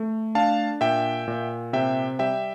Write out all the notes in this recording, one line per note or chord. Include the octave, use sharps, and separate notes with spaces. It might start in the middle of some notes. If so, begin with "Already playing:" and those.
Already playing: A3
D4 F5 A5
A#2 E5 G5
A#2
C3 E5 G5
G3 E5 G5